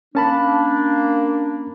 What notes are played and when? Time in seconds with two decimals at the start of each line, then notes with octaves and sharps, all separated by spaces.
0.15 A#3 C#4 D4 A5 B5